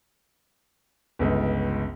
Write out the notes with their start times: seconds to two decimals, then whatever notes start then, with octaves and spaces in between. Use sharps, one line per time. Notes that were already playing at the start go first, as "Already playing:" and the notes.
1.19 G1 C#2